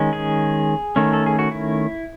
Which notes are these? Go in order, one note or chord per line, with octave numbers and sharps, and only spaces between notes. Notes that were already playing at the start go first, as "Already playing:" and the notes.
Already playing: D#3 G#3 C#4
G#4
D#3 A3 C#4
A4
G#4
F#4
E4